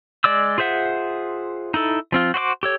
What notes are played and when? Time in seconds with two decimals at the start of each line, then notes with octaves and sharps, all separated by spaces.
0.24 G#3 D5 D6 E6
0.58 F4 G#4 C5 E5 F#5
1.74 D#4 E4 A4
2.12 F3 C4 F4
2.34 F#4 C5 D#5 D6
2.63 G4 A4 C#5